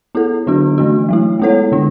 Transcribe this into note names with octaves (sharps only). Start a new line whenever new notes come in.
B3 E4 A4
D3 F#3 B3 D4 F#4
E3 A3 D4 F#4
F#3 A3 E4
G#3 B3 E4 A4 C#5
D3 G#3 D4